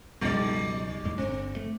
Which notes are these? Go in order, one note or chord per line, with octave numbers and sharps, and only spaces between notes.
C#2 F#2 B2 G3 D#4 D5
E2 A2 G#3
G1 D3 C4
A3